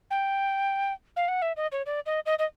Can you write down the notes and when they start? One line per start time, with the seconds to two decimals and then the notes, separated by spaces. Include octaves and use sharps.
0.11 G5
1.16 F5
1.28 F#5
1.42 E5
1.57 D#5
1.72 C#5
1.86 D5
2.06 D#5
2.26 D#5
2.39 D#5